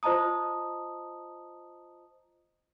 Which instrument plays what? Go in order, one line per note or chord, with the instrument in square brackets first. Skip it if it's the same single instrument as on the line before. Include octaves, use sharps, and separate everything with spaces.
[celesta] F4 C5 D#5 A5 A#5 D#6